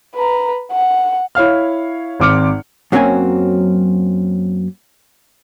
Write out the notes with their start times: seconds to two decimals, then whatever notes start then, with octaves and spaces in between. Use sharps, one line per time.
0.15 B4 A#5
0.72 F#5
1.35 E4 C#5 F5 F6
2.20 G#1 C4 D6 F6 C#7
2.92 F#2 F#3 A#3 C4 C#4 G#5